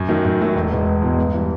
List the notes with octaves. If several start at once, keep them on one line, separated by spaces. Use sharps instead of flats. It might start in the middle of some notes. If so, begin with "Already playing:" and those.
Already playing: F#2
D#3 F#3 A3
F#2
D#3 F#3 A3
E1
E2 B2 G#3
E1
E2 B2 G#3
G2
E3 G3